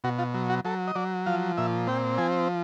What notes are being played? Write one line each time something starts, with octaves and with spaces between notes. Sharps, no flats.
B2 F#4
F4
F#3
F#4
F#3 A4
D#5
F#3 D5
F3 F5
A#2 E5
C4 G5
F3 G#5